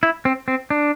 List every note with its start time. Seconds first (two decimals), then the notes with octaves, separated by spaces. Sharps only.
0.03 E4
0.25 C4
0.48 C4
0.70 D4